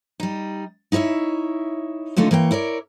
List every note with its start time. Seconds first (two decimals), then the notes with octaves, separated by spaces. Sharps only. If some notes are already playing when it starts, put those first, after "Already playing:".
0.20 G3 D#4
0.92 D#4 E4 A#4 C#5 E5
2.16 D#2 D3 A3 C#4 D#4 F4
2.31 E3 A#3 C#5 G5
2.51 E4 A#4 C#5 D5